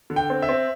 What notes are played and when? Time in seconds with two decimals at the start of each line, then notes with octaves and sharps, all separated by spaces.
0.10 D3
0.16 G5
0.30 C4
0.42 E5
0.49 C4